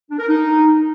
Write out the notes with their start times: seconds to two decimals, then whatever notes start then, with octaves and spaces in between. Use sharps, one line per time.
0.10 D4
0.19 A#4
0.28 D#4